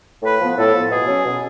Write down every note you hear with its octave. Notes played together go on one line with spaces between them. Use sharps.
A2 B4
F3 B3
A2 A4
F3 B3
B2 G#4
F#3 C#4
B2